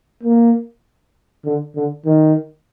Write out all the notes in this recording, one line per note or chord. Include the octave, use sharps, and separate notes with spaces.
A#3
D3
D3
D#3